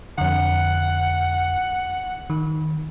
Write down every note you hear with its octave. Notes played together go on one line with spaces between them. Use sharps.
F2 D3 F#5
D#3